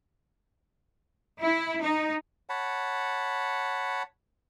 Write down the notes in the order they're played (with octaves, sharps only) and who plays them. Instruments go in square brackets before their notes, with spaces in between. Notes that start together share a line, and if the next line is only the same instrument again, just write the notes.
[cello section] E4
D#4
[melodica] C#5 F#5 A5 B5